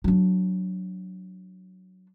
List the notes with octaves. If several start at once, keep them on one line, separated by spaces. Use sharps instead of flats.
F#3 D4